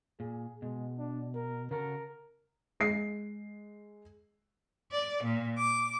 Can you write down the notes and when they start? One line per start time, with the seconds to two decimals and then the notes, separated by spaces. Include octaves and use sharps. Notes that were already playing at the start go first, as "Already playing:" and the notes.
0.20 A#2 G#4
0.62 B2 G#3
0.98 D4
1.35 A#4
1.71 C#3 F#4 A4 A#4
2.80 G#3 C7
4.92 D5
5.23 A#2
5.59 D6